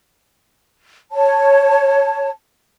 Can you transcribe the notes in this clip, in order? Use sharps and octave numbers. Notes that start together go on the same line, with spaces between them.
C#5 A5